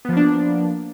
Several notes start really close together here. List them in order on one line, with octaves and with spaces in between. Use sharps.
B3 F3 A#3 D4